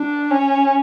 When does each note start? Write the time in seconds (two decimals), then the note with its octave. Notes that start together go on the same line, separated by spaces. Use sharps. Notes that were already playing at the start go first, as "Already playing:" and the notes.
Already playing: D4
0.30 C#4